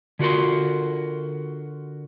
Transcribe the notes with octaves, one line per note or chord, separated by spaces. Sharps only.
D3 F4 F#4 A#4 C6